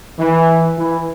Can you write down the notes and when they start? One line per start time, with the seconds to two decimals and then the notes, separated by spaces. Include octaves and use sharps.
0.19 E3
0.77 E3